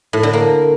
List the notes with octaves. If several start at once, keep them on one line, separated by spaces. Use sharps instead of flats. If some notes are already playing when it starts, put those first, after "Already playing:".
A2
D3
A#3